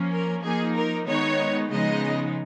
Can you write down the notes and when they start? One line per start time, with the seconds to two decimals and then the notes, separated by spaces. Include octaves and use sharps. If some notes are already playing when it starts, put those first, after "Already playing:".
Already playing: F3 A#3 C#4
0.11 A#4
0.43 F3 A#3 D#4 G#4
0.74 A#4
1.06 D#3 G#3 B3 D#4 C#5
1.70 C#3 F3 G#3 B3 D#4 D#5